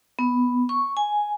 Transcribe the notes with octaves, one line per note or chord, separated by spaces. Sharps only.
B3
C#6
G#5